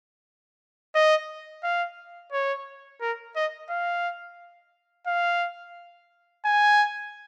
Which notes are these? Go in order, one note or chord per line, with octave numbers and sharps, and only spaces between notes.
D#5
F5
C#5
A#4
D#5
F5
F5
G#5